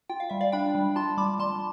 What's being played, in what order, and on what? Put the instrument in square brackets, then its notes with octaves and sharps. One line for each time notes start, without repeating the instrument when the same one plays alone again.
[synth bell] F4 G5
F5
G3 E5
D5 F5
D4 G5 B5
G3
F4 A5 C6
G3 B5 D6
G3 A5 C6